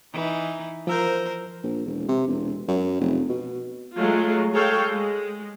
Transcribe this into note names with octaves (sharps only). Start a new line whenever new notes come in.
E3 D#4
F3 A#4 C5 E6 G6
A#1
E1
C3
E1
F#2
F1
B2
F#3 G#3 A3 F4
G#3 G#4 A4 C#5 F5 G5
G#3